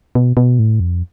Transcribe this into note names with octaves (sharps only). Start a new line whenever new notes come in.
B2
B2
A2
F2